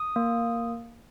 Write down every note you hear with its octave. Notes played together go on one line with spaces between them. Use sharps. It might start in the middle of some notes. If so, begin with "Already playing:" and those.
Already playing: D#6
A#3